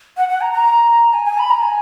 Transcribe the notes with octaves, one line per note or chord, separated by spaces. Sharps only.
F#5
F#5
A#5
A#5
G#5
G#5
B5
A#5
G#5